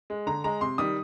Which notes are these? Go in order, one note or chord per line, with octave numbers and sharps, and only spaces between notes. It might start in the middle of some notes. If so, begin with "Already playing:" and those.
G#3
D3 A#5
G#3 A#5
C3 C6
D#3 G3 D#6